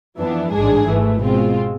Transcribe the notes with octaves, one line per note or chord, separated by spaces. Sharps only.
F2 E3 B3 D4
A1 G#2 G#3 D4 G#4
G#1 G#2 E3 A3
B2 G#3 C4 F4